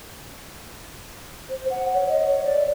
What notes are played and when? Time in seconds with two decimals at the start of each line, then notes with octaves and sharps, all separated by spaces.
1.50 C5
1.70 F#5
1.94 C#5
2.09 D#5
2.26 C#5
2.44 D5